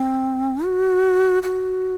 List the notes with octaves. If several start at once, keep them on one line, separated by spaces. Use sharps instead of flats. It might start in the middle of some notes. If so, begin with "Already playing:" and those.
Already playing: C4
F#4
F#4